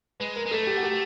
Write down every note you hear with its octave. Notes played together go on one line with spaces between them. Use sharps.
G#3 B4
A#4
G#3
A3 A4
G4
F#4
G4